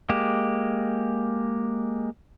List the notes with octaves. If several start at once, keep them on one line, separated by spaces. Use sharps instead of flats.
G#3 A#3 G4